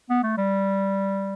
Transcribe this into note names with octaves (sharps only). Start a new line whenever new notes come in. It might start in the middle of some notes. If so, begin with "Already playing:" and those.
B3
A3
G3